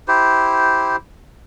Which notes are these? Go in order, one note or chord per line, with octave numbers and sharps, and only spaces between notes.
E4 G4 C5